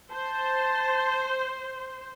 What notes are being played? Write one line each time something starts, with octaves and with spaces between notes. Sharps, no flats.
C5 A5